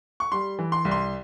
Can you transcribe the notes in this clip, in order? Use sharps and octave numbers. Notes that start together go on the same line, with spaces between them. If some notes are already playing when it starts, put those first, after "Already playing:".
C#6
G3 C6
E3
C6
C2
C6